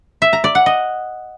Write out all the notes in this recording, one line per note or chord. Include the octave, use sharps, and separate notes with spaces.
E5
A#5
D5
F#5
D#5